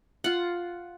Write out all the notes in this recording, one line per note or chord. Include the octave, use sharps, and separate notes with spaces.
F4 F#5